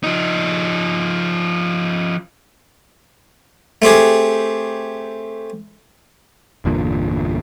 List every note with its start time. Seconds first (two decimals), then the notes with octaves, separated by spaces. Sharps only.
0.03 F3 D#4
3.82 A3 C4 G4 G#4
6.65 G1 E2 A#2 D3